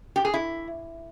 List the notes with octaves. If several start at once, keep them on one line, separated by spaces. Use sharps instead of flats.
G4
G#4
E4